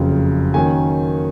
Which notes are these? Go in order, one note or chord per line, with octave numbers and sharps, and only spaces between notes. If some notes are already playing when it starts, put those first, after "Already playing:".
Already playing: F#1 F2 C#3 F#3
D#3 F#3 A#3 C#4 G#5